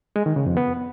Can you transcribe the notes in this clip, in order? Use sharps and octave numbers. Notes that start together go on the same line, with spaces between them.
G#3
D#3
C#3
F2
B3